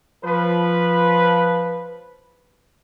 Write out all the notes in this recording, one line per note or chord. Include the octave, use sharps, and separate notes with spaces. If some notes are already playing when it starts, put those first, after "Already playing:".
F3 B4